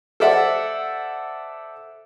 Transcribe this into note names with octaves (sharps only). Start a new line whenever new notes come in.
A4 C5 D5 E5 F#5